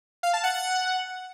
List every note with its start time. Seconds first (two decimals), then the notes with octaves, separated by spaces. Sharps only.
0.23 F5
0.33 A5
0.44 F#5
0.54 F#5